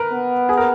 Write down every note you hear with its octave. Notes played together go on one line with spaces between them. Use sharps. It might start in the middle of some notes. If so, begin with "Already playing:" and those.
Already playing: A#4 B4
B3
G#4
A#4